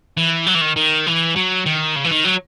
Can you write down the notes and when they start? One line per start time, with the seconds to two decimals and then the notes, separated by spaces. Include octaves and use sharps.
0.17 E3
0.46 F#3
0.55 E3
0.61 D#3
0.76 D#3
1.06 E3
1.36 F#3
1.66 D#3
1.96 C#3
2.04 E3
2.11 D#3
2.25 F#3